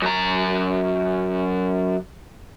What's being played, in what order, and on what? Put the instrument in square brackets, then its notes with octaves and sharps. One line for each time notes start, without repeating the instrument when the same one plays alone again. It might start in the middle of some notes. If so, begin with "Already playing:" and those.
[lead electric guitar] F#2 A#5